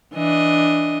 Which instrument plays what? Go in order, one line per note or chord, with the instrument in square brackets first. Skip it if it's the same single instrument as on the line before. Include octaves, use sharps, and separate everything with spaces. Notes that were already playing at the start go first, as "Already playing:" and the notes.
[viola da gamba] E3 D4 D#5